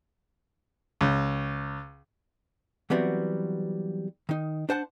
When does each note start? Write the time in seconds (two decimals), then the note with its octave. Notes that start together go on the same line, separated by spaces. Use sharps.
1.01 C#2
2.90 E3 F#3 G3 B3 C4 F#4
4.29 D#3 D#4
4.69 D4 C5 F#5 A5